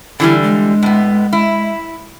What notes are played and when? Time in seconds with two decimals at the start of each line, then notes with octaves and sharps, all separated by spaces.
0.20 D3 E3 G3 E4
0.43 G#3
0.83 A2 B3
1.33 E4